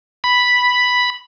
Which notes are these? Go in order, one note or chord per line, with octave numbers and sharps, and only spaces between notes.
B5